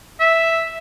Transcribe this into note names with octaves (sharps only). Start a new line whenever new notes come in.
E5